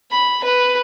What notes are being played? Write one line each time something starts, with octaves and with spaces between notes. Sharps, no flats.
B5
B4